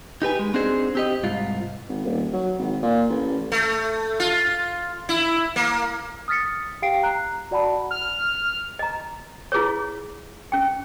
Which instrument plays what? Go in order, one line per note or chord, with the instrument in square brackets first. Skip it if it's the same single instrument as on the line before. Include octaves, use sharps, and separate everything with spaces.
[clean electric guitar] D#4 G4 B4 G#5
G#3
C4 D4 D#4 F#4 G#4 C5
C4 G4 D#5
C2 G#2 F4
[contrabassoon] G#1
D#1
F#3
G#1
A#2
A1
[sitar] A3
F4
E4
A#3
[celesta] D#6 F6 A6 B6 C#7
G4 F5 G5 C7 D7
A#5 F#6
F#4 D5 F#5 A5 B5
[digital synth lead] F6
[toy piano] D#5 A#5
E4 F4 G#4 B4 C#5
C#4 G5